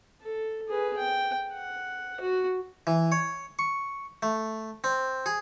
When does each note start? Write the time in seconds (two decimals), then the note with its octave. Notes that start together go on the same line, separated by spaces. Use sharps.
0.22 A4
0.68 G#4 B4
0.97 G5
1.53 F#5
2.20 F#4
2.87 E3
3.12 C#5
3.59 C#6
4.23 A3
4.84 C4
5.26 G#4